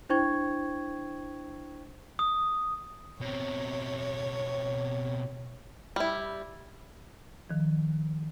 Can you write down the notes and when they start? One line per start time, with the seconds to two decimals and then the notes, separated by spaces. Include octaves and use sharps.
0.09 D4 E4 C5 G5 C#6 G#6
2.19 D#6
3.21 B2 C4 C#5
5.96 G3 E4
7.50 D#3 F3